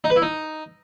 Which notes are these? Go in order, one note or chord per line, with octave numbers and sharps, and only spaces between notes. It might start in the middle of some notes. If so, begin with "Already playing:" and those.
D#4
B4
E4
D#4